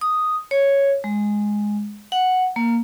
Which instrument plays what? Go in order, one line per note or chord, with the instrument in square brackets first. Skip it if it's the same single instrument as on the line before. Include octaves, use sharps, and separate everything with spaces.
[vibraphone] D#6
C#5
G#3
F#5
A#3